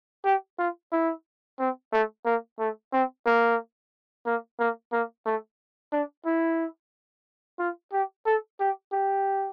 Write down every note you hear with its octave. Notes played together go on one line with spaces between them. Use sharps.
G4
F4
E4
C4
A3
A#3
A3
C4
A#3
A#3
A#3
A#3
A3
D4
E4
F4
G4
A4
G4
G4